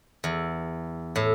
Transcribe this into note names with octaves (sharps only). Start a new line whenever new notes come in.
E2
A2